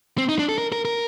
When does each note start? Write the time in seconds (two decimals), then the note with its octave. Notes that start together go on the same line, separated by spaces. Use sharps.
0.18 C4
0.29 D#4
0.39 D4
0.49 A4
0.58 A#4
0.72 A#4
0.85 A#4